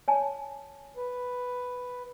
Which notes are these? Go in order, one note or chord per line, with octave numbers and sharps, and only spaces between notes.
C#5 G#5 A5
B4